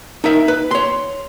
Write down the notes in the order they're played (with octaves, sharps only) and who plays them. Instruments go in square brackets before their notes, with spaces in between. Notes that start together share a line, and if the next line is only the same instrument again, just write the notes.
[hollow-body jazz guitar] D#4 A#4 E5
B4
C#5 C6